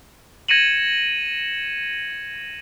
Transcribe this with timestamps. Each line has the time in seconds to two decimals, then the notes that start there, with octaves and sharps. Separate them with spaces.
0.48 G#6 A#6 C#7 D#7 E7 F#7